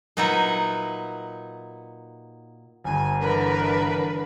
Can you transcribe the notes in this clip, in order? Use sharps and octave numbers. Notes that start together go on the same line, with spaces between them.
A#2 F#3 D#4 B4 E5 F#5
G1 G2 G#5
D3 E3 A#4 B4